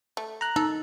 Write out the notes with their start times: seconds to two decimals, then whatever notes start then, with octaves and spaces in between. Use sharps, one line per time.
0.17 A3
0.41 A#5 F#6
0.56 D#4 A4